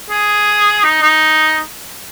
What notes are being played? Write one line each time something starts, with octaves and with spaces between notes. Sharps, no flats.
G#4
D#4
D#4